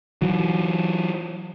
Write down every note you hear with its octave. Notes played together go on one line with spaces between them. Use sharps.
E3 F#3